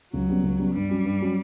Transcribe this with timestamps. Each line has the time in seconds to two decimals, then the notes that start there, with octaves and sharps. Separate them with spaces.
0.13 C#2 F#3
0.29 C#3 G3 B3
0.43 C#2
0.59 C#3 G3 B3
0.74 G2 G3
0.90 F#3 C#4
1.05 G2
1.21 F#3 C#4